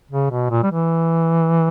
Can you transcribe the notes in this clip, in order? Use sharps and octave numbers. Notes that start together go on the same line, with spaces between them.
C#3
B2
A#2
G3
E3